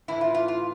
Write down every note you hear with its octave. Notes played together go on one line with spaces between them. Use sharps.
A2 E3 E4
F4
F4
F4